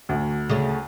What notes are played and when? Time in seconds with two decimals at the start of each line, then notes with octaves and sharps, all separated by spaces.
0.09 D2
0.49 C#3 A3